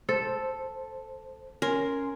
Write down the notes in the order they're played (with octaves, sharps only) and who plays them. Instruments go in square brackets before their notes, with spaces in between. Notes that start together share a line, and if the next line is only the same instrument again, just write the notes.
[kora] A4 [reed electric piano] C5
[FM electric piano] C#4 G#5 C6 [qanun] A#4